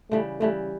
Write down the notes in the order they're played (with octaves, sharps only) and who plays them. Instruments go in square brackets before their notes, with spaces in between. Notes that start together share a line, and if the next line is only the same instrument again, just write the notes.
[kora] C#3 E3 G3 [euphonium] A3
[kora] C#3 E3 G3 [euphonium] A3